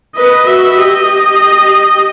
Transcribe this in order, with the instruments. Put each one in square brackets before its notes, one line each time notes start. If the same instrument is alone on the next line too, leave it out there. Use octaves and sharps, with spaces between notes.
[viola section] B4 [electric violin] D#5
[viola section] F#4 [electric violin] E5
[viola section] G4 [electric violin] D#5